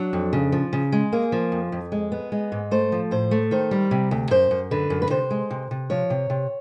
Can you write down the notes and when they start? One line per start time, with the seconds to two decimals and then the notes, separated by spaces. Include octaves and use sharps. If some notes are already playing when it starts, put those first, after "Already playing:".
Already playing: F#3 D4
0.13 F2
0.33 C#3
0.52 F3
0.73 C#3
0.92 G#3
1.12 A#3 G#4
1.32 F3
1.52 F2
1.72 F2
1.92 G#3
2.12 B3
2.32 G#3
2.52 G#2
2.71 A3 C5
2.92 F3
3.11 A2 C5
3.31 A3
3.51 D#3 C5
3.71 G3
3.91 C3
4.11 D2
4.31 F#2 C5
4.51 F#2
4.71 D3 B4
4.90 F#2
5.02 B4
5.10 C3 C5
5.31 G#3
5.50 C3
5.71 C3
5.90 F3 C#5
6.10 C3
6.30 C3